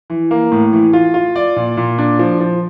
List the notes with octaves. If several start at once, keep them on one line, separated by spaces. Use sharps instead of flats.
E3
A#3
A2
E3
F4
F4
D5
A#2
A#2
D4
F3
F3